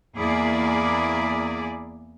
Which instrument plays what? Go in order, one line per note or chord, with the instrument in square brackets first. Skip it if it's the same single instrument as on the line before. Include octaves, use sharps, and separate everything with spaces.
[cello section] E2 A#3 E4 G#4 D5